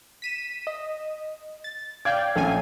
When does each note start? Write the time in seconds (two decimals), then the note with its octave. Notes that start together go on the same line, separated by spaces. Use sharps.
0.22 B6 D#7 E7
0.67 D#5
1.64 A6
2.05 D5 F5 G5 G#6
2.36 A#1 C#4 A4 F5 G#5